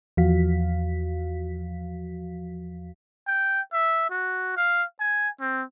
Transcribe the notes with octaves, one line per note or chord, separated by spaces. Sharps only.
E2 F3 F#4 F5 B6
G5
E5
F#4
F5
G#5
C4